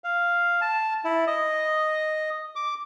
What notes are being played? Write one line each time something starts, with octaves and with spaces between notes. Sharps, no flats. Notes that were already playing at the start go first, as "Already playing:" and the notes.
F5
A5
E4
D#5
D6